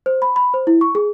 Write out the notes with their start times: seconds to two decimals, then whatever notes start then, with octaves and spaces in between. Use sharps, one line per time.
0.06 C5
0.22 B5
0.36 B5
0.54 C5
0.67 E4
0.81 C#6
0.95 G#4